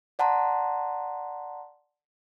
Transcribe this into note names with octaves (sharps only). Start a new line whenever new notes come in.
D5 F#5 A5 A#5 C6